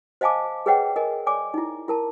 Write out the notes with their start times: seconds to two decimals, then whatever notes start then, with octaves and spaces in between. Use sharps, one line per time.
0.21 C5 D#5 F5 G#5 A5 D6
0.66 G#4 B4 C#5 D#5 F#5 G5
0.96 A#4 D#5 G#5
1.26 C#5 D5 G#5 D6
1.54 D#4 E4
1.88 E4 A#4 A5